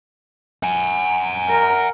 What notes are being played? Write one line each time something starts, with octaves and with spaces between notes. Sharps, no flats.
F#5 G#5
A#4